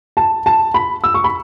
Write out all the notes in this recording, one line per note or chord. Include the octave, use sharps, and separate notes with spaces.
A5
A5
B5
E6
C#6
B5